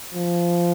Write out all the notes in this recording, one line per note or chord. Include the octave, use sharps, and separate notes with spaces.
F3